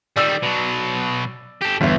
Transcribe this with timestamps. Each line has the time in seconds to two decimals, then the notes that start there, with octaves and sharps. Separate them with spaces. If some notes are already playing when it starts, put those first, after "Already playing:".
0.17 D#3 G3 D5 E6
0.43 B2 F#3
1.61 G4 A4
1.81 G1 E2 B3 E5